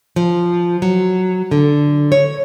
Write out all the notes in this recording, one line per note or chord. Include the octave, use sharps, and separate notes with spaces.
F3
F#3
D3
C#5